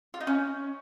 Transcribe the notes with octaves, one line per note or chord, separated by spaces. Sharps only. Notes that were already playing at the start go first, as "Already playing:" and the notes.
F4
D#4
C#4